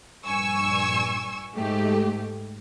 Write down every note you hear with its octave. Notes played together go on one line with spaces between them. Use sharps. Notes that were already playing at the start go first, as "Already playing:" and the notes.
A#1 G2 G#5 C#6 E6
G#2 A3 G4